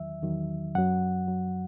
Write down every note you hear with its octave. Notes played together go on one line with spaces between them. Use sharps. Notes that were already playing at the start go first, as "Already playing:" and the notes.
Already playing: E2 D#3 F#3 E5
E2 D#3 F#3
F#2 F#3 F#5
F#2 F#3